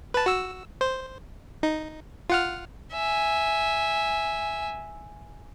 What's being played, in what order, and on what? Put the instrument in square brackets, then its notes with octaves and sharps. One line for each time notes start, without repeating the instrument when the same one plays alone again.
[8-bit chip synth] B4 A5
F#4 E6
C5
D#4
F4 F#5 F6
[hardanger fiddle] E5 G#5